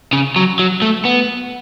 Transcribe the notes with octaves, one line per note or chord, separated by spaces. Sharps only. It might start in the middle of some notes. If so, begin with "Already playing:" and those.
C#3
F#3
F#3
A3
B3